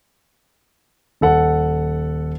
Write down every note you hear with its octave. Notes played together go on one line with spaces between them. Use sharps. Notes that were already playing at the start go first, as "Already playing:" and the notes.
D#1 A4 F#5